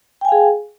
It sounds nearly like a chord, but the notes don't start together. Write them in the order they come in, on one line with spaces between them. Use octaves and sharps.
G5 G#5 F5 G#4